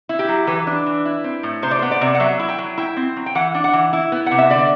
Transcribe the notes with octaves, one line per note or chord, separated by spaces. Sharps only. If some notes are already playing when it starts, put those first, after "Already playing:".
E4
G4
F#3
E3 B4
D4
E3
E4
C4
A2
C3 C5
D5
B3 C5
D5
C3
F#5
F#3 E5
E4
G5
F#3
E4 G5
C4
F#3
G5
E3 F#5
D4
F#5
E3
E4
B3
F#5
C3
E5
D3 D5